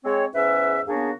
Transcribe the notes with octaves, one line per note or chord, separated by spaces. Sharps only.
G#3 C4 C#5
E2 G#2 C#4 B4 E5
C#3 A#3 B3 D4 F#4 G#4